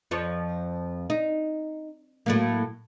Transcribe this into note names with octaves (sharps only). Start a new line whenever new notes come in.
F2 F3 C#5
D#4
A2 F#3 A#3